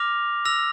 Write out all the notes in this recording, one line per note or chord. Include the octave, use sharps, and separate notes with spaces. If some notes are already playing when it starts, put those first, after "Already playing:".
Already playing: D6 F6 A#6 F7
E6 A#6 F7